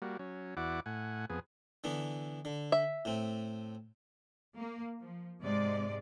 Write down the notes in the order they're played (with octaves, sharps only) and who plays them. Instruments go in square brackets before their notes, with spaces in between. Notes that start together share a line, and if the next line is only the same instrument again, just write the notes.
[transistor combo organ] G3 A#3 F#4
F#3 C#4
E2 E4 F#4 D5 F#5 D6
A2 F#5 G#5
F2 B3 G#4
[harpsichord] D3 E3 B3
D3
[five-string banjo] E5
[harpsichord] A2 C4
[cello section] A#3
F3
G#2 C3 G#3 D5